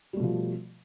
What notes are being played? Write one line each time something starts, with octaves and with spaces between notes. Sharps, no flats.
B2 F3 G3 A3